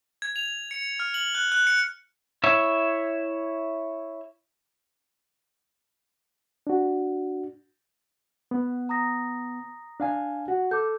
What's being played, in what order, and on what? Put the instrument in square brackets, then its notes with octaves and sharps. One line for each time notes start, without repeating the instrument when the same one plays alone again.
[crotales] G#6
F7
C#7
F6
F#7
F#6
F#6
C#7
[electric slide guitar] E4 C#5 E5
[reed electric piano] D4 F#4
B3
[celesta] A#5 D#6 A#6
[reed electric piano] D4 F5 G#5
[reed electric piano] F#4 [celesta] F#5
[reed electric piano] A4 [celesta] D6 G6